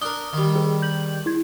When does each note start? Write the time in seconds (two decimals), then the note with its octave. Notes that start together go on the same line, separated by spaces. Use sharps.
0.01 D4 A#4 D#6 G7
0.33 D#3 G3
0.55 G#4
0.82 G6 F#7
1.26 E4 G#6